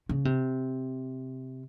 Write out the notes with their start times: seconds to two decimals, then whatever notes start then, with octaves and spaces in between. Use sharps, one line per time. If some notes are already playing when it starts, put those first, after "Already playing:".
0.09 C#3
0.25 C3